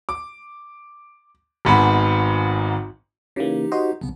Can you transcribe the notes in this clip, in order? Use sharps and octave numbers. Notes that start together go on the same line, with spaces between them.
D6
G#1 G#2 B3 B5
C#3 E3 A#3 D#4 G4
F#4 C5 D#5
B1 C#3 B3